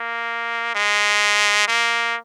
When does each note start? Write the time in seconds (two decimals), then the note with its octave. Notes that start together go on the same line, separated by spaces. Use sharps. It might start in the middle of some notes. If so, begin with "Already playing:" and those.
Already playing: A#3
0.75 G#3
1.68 A#3